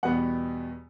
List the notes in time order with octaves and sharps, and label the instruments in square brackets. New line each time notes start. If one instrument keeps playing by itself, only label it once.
[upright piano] E2 B2 G3 B3 F#5